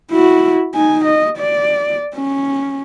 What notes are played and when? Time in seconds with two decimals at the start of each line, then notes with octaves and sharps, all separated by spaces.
0.11 E4 F#4
0.75 D#4 G#5
1.05 D#5
1.38 D5
2.16 C#4